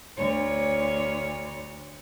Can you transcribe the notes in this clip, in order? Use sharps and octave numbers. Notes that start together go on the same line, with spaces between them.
D2 C#5